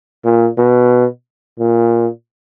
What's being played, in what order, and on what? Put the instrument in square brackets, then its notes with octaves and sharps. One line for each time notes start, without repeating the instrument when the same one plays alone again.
[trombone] A#2
B2
A#2